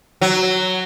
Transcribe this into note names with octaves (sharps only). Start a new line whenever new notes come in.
F#3